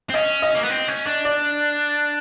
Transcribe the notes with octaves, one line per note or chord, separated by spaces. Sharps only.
C4
C#4 D#5
D#5
A#3
B3
C4
C#4
D4
D5